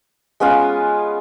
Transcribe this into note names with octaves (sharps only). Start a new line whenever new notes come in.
G#3 B3 C#4 F4